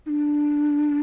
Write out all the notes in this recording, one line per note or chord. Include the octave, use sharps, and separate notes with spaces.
D#4
D4